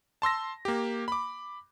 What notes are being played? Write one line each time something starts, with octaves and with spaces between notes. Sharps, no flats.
A5 C6 E6 A#6
A#3 G4
B5 D6